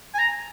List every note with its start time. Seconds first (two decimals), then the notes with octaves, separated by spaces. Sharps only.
0.14 G#5
0.19 A#5